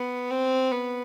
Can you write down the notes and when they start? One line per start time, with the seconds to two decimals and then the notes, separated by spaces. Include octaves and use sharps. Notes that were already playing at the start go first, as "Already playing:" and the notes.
Already playing: B3
0.31 C4
0.71 B3